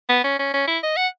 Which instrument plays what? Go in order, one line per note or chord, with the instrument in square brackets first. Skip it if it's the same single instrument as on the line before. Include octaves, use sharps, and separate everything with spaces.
[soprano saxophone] B3
C#4
C#4
C#4
E4
D#5
F#5